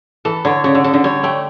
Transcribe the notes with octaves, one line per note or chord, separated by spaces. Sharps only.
E3 A4
D3 C#5
C#3 C#5
D3
C#3 A4
D3
G3 C#5
A3 G5